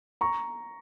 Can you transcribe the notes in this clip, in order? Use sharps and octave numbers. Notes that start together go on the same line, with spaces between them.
A#5 C#6